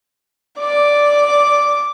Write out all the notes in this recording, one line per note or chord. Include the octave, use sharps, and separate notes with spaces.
D5 D6